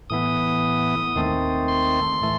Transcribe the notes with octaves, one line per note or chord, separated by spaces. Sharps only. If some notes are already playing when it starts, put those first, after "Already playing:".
A2 E3 B3 D#6
D#2 D#3 A3 C4
C6
A2 E3 A3